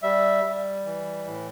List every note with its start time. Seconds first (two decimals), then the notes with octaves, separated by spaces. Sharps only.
0.03 G3 E5
0.45 G3
0.86 E3
1.27 A2